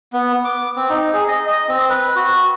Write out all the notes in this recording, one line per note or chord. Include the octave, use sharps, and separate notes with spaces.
B3
D6
C4
D#4
G#4
D#5
D#5
C4
B4
F#4